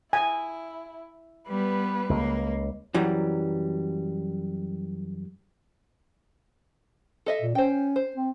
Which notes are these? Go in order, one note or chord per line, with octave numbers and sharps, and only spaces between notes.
E4 G#5
G3 B3 B4
C#2 A#3
F#2 E3 F#3 G3
A4 D#5 E5
A#2
C#4 C5 G5
C5
C4